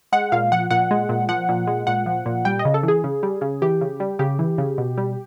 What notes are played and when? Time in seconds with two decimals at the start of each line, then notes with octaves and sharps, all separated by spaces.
0.12 G#3 F#5
0.32 A#2 F5
0.52 F3 F#5
0.71 A#2 F#5
0.91 G#3
1.09 A#2
1.29 F3 F#5
1.49 A#2
1.67 G#3
1.87 A#2 F#5
2.06 F3
2.26 A#2
2.45 G3 G5
2.59 D#5
2.65 C#3
2.74 A4
2.83 E3
2.88 G#4
3.04 C#3
3.23 G3
3.41 C#3
3.62 E3 G4
3.81 C#3
4.00 G3
4.19 C#3 G4
4.39 E3
4.58 C#3
4.78 B2
4.98 G3